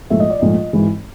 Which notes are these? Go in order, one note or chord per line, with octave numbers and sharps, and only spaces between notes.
A#1 G#2 F3 A3 E5
D#5
D5
A#1 G#2 F3 A3 D#5
G#1 G#2 E3 G#3